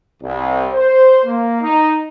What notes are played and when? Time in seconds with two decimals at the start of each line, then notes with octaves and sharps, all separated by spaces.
0.22 C2
0.73 C5
1.25 A#3
1.62 D#4